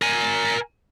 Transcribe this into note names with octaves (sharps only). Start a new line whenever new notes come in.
A#4 G#5